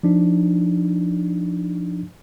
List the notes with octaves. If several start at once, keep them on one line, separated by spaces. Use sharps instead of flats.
F3 D4 D#4